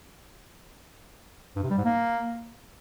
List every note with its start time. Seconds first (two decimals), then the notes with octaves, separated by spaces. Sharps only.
1.56 G2
1.63 C3
1.71 G3
1.78 G#2
1.85 A#3